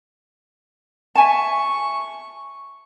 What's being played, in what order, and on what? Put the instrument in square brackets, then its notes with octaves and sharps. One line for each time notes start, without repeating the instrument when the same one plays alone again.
[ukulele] E5 G#5 A5 [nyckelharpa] C#6